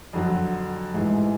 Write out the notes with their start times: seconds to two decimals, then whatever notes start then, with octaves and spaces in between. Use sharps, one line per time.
0.13 F2 D3 F#3
0.94 A1 G#2 E3 G#3